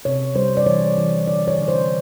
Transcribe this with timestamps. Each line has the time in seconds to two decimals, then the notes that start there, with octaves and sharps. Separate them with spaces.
0.05 C3 C#5
0.35 G3 C5
0.57 D5
0.66 E3 C#5
0.97 E3
1.27 D3 D5
1.48 C#5
1.58 D3
1.68 C5